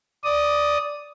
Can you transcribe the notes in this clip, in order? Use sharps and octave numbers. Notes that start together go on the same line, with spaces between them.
D5 D#6